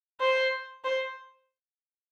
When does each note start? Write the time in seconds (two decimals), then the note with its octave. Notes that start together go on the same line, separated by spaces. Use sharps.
0.20 C5
0.84 C5